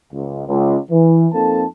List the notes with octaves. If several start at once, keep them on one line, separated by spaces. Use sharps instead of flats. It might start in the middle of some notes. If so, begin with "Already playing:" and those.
C#2
C#2
E3
F2 A#3 C4 D#4 A4 A5